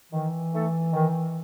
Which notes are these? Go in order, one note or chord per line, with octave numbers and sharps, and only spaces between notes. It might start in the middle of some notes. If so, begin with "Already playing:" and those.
D#3 E3
A3 D#4 A4
D#3